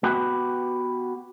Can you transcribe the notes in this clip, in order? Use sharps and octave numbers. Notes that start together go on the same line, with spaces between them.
B3 F#4 G4 B4